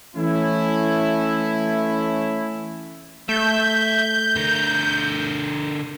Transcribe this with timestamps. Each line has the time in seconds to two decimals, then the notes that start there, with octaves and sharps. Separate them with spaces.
0.16 E3 A3 C#4 E4
3.29 A3 E5 G6
4.36 D3 A#4